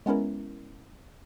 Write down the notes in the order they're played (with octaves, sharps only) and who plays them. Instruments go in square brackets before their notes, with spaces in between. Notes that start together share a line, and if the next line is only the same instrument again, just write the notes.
[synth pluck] G#3 B3 C#4 E4 A#4